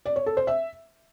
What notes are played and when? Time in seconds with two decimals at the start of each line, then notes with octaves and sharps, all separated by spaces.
0.06 D5
0.16 C#5
0.26 A4
0.37 C5
0.47 E5